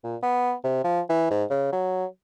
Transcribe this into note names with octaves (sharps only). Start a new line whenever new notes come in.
A#2
B3
C3
F3
E3
G#2
C#3
F#3